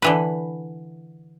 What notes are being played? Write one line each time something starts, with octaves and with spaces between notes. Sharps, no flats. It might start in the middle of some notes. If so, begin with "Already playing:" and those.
D3 E3 B4